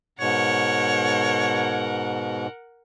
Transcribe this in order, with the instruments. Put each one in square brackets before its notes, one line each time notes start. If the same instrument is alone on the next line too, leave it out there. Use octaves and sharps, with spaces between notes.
[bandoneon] G#2 B2 [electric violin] A#4 F#5 [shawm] C#5